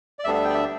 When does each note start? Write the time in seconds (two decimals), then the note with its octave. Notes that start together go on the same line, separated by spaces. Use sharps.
0.19 D5
0.24 D2 D3 G3 B3 D4 E5
0.34 E5
0.44 G5
0.49 D5
0.54 E5